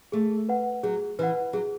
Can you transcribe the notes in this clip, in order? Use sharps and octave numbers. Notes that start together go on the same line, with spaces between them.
A3 G#4
B4 F#5
F#3 G#4
E3 B4 F#5
F#3 G#4